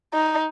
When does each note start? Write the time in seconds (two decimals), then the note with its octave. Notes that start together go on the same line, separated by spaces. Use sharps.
0.14 D#4